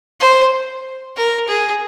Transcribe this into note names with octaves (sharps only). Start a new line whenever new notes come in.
C5
A#4
G#4